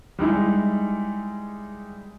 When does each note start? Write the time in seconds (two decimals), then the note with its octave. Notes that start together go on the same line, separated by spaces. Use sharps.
0.19 G3 G#3 D#4 E4